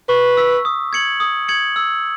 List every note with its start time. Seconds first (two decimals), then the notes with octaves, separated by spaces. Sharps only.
0.09 B4 C#6
0.37 E6 B6
0.65 D#6
0.93 G#6 C#7 F#7
1.20 D#6
1.48 G#6 C#7 F#7
1.76 E6